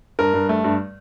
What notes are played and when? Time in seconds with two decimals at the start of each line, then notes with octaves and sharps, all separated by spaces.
0.19 G2 A#4
0.34 G2
0.49 A3
0.64 G2